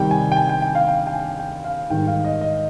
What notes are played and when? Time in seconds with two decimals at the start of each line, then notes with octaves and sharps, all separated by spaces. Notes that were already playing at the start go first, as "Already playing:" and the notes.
Already playing: C3 D#3 G3 G5
0.11 G#5
0.32 G5
0.37 G#5
0.49 G5
0.62 G5
0.75 F5
0.88 G5
1.07 G5
1.13 G#5
1.39 G5
1.65 F5
1.90 G#2 D#3 G3 G5
2.07 F5
2.24 D#5
2.41 D#5